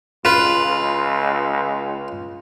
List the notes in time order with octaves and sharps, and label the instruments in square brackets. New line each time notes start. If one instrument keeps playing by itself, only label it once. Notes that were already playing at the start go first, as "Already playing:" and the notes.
[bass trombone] C#2 [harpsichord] F4 B4